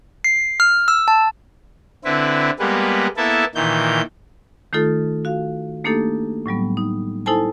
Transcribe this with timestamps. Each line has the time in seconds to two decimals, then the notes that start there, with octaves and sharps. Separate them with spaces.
0.24 C7
0.60 F6
0.88 E6
1.08 A5
2.05 D3 C4 E4 B4
2.59 G3 G#3 A#3 B3 B4
3.17 A#3 B3 E4 A4 E5 A5
3.55 A#2 D#3 E3 G6
4.73 D#3 A3 D#4 F4 A4
5.25 F#4 F5
5.84 A3 A#3 D4 D#4 G4 A4
6.46 A2 F#3 G3 B3
6.77 D#4
7.26 D#4 E4 A4 C5 G#5 A5